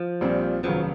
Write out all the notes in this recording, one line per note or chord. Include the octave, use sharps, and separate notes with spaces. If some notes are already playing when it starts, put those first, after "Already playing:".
Already playing: F3
A#1 A#2 G3 C4
F1 D#2 C#3 F3 F#3 B3